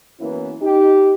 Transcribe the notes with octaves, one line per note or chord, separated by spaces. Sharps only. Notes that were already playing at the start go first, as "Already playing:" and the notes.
F#2 E3 A#3 B3 C#4 E4
D#4 G4